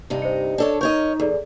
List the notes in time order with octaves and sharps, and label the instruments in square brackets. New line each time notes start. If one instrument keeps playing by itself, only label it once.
[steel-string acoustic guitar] G2 C3 D#4
[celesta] C5 C#7 [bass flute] D#5
[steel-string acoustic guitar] D4 A4 C#5 [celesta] D5
[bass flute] D#4 [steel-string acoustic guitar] A#4 C#5 D#5 [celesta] C#6 G6
[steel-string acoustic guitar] E2 [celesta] G#4 A4 D5